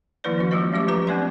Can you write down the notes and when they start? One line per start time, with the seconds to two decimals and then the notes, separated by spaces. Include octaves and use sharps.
0.24 D#3 F3 A#3 E4 B4 D5
0.38 F3 C#4 F#4
0.51 F#3 G#3 A#3 F4 C5 D#5
0.72 F#3 A3 C#4 G4 D6
0.87 F3 F#3 F4 B4 A#5 D6
1.07 B3 C4 D4 D5 E5 C6